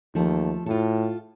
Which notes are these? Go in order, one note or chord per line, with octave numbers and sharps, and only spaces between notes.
D#2 F3 A3 A4
A2 F4 A4